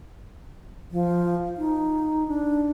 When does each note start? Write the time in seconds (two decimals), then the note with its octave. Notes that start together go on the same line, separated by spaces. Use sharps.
0.91 F3
1.57 D#4
2.28 D4